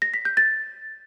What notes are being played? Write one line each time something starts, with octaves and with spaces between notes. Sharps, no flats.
A#6
B6
G6
A6